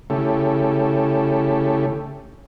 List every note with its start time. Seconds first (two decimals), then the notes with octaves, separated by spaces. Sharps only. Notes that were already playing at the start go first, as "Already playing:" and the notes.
0.10 C#3 A3 C#4 E4 G4 A4